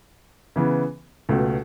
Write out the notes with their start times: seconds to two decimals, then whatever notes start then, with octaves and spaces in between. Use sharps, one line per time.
0.56 C#3 E3 B3
1.29 C#2 B2 A3